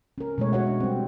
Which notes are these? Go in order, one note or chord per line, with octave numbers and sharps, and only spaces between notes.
C#4 A#4
B2 G#3 A3 C#5
F#4 C#5 F#5
D4
G3 C4